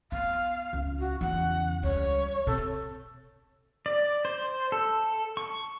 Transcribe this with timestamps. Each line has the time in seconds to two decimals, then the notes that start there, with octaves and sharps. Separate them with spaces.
0.12 B3 F5
0.73 C#2
0.99 F#4
1.21 E2 C#3 F#5
1.83 C#2 G3 C#5
2.47 C3 A4
3.86 D5
4.25 C5
4.72 A4
5.37 C#6